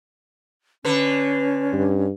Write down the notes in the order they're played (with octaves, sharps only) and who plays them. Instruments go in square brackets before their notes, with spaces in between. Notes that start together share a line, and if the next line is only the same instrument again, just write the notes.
[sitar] D3 B4 [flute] C#4
[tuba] G2